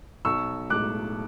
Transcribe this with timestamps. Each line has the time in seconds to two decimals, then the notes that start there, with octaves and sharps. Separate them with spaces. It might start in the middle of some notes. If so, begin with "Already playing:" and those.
0.25 B1 C#6 E6
0.70 A2 G#3 D6 F#6